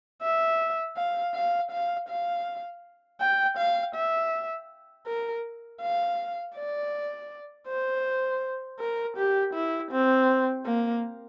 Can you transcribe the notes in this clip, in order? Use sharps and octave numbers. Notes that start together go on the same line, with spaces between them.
E5
F5
F5
F5
F5
G5
F5
E5
A#4
F5
D5
C5
A#4
G4
E4
C4
A#3